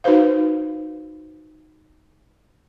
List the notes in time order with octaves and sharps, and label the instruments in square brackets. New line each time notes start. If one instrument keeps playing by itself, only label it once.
[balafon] D#4 F#4 B4 C5 F5